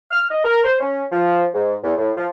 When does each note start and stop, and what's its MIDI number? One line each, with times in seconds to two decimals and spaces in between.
0.11 0.26 89
0.31 0.44 75
0.45 0.64 70
0.64 0.78 72
0.79 1.03 61
1.12 1.45 53
1.54 1.75 44
1.84 1.93 40
1.97 2.12 45
2.17 2.26 53